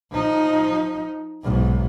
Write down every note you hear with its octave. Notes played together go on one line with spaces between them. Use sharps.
F3 D#4
B1 G#2